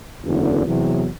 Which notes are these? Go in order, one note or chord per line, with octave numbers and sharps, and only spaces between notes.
F#1 E2 D3
E2 C3 F#3